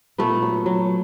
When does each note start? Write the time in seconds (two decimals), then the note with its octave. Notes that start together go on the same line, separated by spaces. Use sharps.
0.18 A#2 A3 B3
0.42 F#3
0.66 F#3